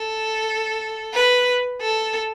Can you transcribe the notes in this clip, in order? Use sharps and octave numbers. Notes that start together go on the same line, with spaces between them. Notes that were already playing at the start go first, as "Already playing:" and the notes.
Already playing: A4
B4
A4